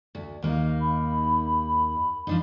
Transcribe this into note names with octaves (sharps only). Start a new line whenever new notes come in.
D2
D#2 A#3 D#4
B5
F3 D4 D#4